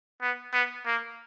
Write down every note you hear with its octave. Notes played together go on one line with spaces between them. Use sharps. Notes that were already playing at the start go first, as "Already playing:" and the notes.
B3
B3
A#3